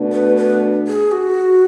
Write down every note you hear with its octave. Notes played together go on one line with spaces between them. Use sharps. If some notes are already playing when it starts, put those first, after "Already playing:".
Already playing: B2 A3 D4
B4
B4
G#4
F#4